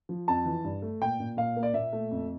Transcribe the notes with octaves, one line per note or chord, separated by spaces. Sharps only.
F3
F2 A5
E3
G2
A3
A#2 G5
A#2
A#2 F5
A#3
D5
A#2 E5
A3
F2